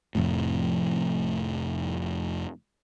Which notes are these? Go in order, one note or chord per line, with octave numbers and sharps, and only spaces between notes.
F1 F2 A2